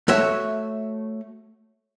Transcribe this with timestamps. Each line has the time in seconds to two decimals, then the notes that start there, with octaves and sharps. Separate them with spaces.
0.08 A3 F#4 C#5 E5